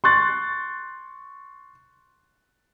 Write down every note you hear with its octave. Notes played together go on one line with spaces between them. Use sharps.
C6 C#6 F#6 A6